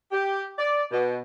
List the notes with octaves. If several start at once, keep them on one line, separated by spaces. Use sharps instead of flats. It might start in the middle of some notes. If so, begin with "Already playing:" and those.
G4
D5
B2